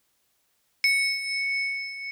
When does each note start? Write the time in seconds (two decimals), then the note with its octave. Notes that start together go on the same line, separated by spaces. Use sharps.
0.84 C#7